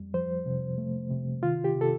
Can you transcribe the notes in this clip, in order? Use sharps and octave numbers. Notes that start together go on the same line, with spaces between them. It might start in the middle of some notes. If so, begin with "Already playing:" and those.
Already playing: F2 G3
F3 C5
C3
A3
C3
D#3 F4
G4
C3
A4